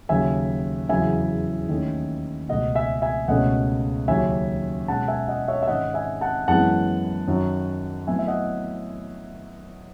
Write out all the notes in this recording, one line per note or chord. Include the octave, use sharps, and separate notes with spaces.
D#2 C#3 F#3 E5 G#5
E2 C#3 F#3 E5 G#5
D#2 D#3 A3 C#4
C#2 B2 A3 D#5 F#5
E5 G#5
E5 G#5
C#2 B2 A3 C#4 D#5 F#5
D#2 C#3 F#3 C#4 E5 G#5
B2 G#3 C#4 F#5 A5
E5 G#5
D#5 F#5
C#5 E5
E5
G#2 D#3 G#3 C#4 D#5 F#5
E5 G#5
F#5 A5
F#2 E3 G#3 B3 F#5 A5
F#2 D#3 F#3
A2 F#3 B3 E5 G#5
E5
D#5 F#5